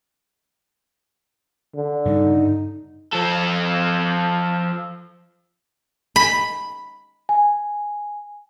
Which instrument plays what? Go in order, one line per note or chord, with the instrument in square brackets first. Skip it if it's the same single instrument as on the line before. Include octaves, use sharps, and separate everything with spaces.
[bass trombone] D3
[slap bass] G2 C#3 G3 [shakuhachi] D#4
[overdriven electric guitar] F3 A4
[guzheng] B5
[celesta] G#5